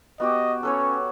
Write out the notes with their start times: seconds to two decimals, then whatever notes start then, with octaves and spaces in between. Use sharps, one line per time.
0.20 B3 F#4 G4 D#5
0.63 C#4 A4 B4 C#5